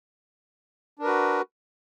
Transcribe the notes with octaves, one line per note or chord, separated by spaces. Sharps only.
D4 F#4 A#4 B4